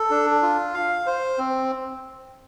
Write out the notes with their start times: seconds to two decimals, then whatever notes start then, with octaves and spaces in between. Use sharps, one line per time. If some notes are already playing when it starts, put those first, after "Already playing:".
Already playing: A4
0.10 D4
0.42 F4
0.74 F5
1.06 C5
1.38 C4